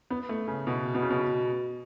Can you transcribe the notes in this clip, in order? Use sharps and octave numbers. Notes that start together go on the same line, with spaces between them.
B3
A3
C#3
B2
B2
C#3
B2